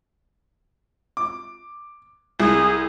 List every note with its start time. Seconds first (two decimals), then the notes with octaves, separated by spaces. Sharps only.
1.17 D6
2.40 C2 G#4